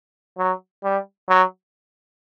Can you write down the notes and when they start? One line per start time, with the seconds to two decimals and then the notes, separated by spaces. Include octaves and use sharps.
0.38 F#3
0.84 G3
1.29 F#3